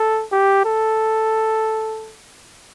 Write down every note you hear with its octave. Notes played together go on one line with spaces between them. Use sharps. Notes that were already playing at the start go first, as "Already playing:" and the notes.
Already playing: A4
G4
A4